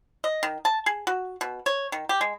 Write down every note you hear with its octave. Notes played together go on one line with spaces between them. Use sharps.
D#5
D#3
A5
G#4
F#4
B2
C#5
D#3
G4
G#3